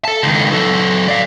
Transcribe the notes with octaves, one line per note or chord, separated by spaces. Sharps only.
A4 A5
C#2 D#3
F#3 A4
D5 F5